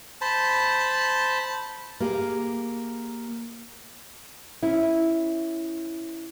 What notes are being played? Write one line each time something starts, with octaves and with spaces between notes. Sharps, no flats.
C5 A5 B5
A#3 G4 G#4
C#4 E4